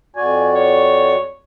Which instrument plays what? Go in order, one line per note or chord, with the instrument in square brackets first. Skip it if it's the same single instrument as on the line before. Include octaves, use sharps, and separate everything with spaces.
[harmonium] F2 F#4 D5 [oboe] G#5
[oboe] C#5